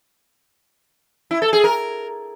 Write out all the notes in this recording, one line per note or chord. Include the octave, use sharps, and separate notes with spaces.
E4
A4
G#4
A#4